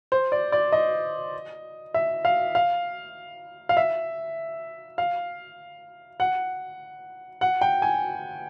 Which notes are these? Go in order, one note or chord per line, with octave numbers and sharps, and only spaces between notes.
C5
D5
D5
D#5
E5
F5
F5
F5
E5
F5
F#5
F#5
G5
G#5